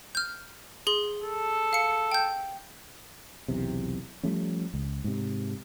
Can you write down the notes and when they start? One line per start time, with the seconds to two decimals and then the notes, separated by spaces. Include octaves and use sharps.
0.15 F6 G6
0.87 G#4 C6 G7
1.22 A4
1.73 F5 C#7
2.11 G5 G6
3.48 B1 E2 C3
4.23 F3 G3 A3 C#4
4.74 C#2
5.04 G#2 C3